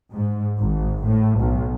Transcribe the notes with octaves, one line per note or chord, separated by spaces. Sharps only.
G#2
G#1
A2
B1